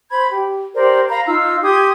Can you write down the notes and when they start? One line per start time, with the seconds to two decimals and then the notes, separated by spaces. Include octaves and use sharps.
0.10 C5 B5 G#6
0.29 G4
0.75 G4 A#4 C5 D5
1.09 F5 A#5 B5
1.27 D#4 F4 F5 E6
1.62 G4 C6 D#6 G#6